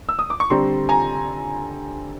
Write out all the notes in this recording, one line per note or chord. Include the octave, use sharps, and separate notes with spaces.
E6
D#6
D6
C#6
D3 G3 C4 A#5 C6
G#5 A#5